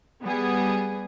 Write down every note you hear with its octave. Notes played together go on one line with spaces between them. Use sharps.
G3 B3 G#4